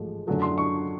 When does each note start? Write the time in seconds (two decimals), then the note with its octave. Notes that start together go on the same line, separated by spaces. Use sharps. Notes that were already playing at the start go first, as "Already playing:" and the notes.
Already playing: A1 G#2 F3 A3
0.27 F#2 D3 F#3 A3
0.42 C6
0.58 C#6